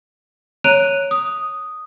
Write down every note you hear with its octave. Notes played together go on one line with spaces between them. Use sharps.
C#5 A#5 F#6 D7 D#7 F7
D#6